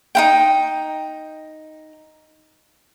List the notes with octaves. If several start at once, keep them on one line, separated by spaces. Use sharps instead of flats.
D#4 E4 G5